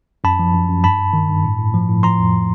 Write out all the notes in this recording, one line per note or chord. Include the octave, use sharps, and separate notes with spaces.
F#2 A5 B5
F3
F#2
F#2
G2 A5 B5
G2
D#3
G2
A2
A2
F3
A2
F3 A#5 C6
F2